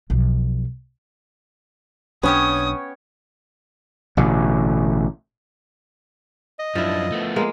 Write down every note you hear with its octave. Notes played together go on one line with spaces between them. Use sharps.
B1 F3
B1 B3 C#4 D4 G4 C#5 D#6
A1 B2 D3
D#5
F#2 F3 D4 E4
A3 B3
G#3 A#3